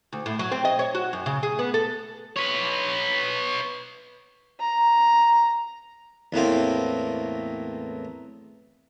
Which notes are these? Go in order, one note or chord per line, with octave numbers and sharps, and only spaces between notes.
D2
A2
F#3
C4
D#5
C#5
F#4
F#2
C#3
G#4
B3
A4
B4 C#5
A#5
E2 A2 A#3 C4